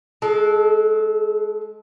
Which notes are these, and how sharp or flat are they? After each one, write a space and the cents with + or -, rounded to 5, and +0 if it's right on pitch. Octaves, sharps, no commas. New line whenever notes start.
G#3 +20 A4 -20